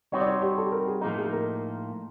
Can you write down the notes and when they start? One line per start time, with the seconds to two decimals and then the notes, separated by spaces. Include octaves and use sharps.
0.12 G3 C4 D#4 F#4 C#5
0.20 D5
0.26 C#5
0.42 G4
0.57 A4
0.72 A#4
0.87 G#4
1.01 A2 F3 A#3 D#4
1.17 G#4
1.32 A#4